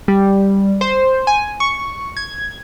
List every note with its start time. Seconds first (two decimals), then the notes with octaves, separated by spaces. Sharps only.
0.08 G3
0.81 C5
1.27 G#5
1.60 C#6
2.17 G#6